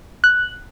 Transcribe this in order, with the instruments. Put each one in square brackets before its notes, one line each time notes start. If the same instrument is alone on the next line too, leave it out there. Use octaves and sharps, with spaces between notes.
[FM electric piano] F#6